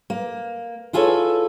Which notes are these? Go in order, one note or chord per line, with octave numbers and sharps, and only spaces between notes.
A#3
E4 F4 G#4 A4 C5 C#5